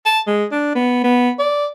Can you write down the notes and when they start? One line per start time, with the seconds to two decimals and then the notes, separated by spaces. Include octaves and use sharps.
0.06 A5
0.27 G#3
0.52 D4
0.75 B3
1.04 B3
1.39 D5